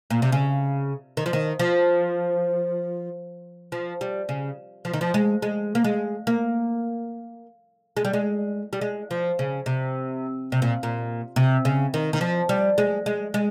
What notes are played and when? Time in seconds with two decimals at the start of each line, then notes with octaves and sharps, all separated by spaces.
0.10 A#2
0.22 C3
0.32 C#3
1.17 D#3
1.26 F3
1.33 D#3
1.59 F3
3.72 F3
4.01 G3
4.29 C#3
4.85 F3
4.93 D#3
5.01 F3
5.14 G#3
5.42 G#3
5.75 A#3
5.84 G#3
6.27 A#3
7.97 G#3
8.05 G3
8.13 G#3
8.73 G3
8.81 G#3
9.11 F3
9.39 C#3
9.66 C3
10.52 C3
10.62 A#2
10.83 A#2
11.36 C3
11.65 C#3
11.94 D#3
12.13 D#3
12.21 F3
12.49 G3
12.78 G#3
13.06 G#3
13.34 G#3